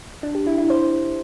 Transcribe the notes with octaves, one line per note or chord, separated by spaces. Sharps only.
D4
G4
E4
E4
C5